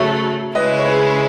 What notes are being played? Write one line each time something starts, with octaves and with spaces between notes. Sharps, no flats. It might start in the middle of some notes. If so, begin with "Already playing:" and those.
Already playing: C#3 F#3 A3 C#5 E5
C#3 G#3 C#4 E4 B4 D#5
C#5
G#4 B4